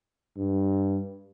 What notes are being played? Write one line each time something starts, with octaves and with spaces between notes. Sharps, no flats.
G2